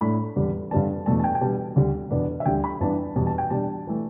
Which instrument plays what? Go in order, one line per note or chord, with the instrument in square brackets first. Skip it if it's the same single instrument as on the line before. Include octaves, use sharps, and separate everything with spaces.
[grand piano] A2 A3 D4 B5
E2 D3 G3 D4
G2 D3 G3 B3 D4 A5
E2 B2 A3 D4 A5
A5
G5
G5
B2 G3 B3 D4 A5
D2 D3 G3
E2 B2 B3 D4
E5
D2 D3 G3 G5
B5
G2 E3 B3 D4 A5
E2 B2 G3 A5
A5
G5
B2 G3 D4 A5
E3 A3